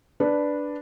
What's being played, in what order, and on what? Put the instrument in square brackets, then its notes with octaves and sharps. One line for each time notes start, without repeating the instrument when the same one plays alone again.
[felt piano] D4 B4